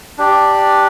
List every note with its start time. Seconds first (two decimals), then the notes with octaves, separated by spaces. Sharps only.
0.18 D4 G4 D5